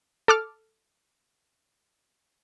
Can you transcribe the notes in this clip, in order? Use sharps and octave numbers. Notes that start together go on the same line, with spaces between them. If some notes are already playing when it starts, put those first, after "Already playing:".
A4 D6 F6